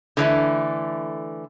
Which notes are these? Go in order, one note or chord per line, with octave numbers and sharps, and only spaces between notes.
D3 E3 A3